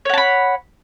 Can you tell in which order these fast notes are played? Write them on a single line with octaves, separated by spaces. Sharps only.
C#5 F#5 A5 B5